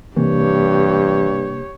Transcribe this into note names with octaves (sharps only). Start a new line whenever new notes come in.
G2 C3 E3 A#3 G4 C#5